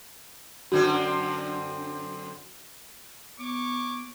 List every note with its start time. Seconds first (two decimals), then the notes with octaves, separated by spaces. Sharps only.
0.72 F#2 D3 C4 F#4
3.39 B3 C#5 C#6 D6